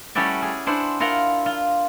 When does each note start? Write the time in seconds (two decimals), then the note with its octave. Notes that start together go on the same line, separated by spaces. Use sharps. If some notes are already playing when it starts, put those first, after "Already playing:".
0.15 G3 A3 C#4 E4 F#4 D5
0.42 G#4
0.66 D4 E4 C5 F#5
1.00 E4 F4 A#4 F#5 A#5
1.46 F4